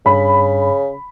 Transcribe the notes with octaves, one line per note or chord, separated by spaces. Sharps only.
G2 C#3 B5